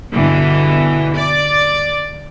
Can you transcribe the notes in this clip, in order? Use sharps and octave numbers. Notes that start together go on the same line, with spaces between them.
G2 B2 D3 E3
D5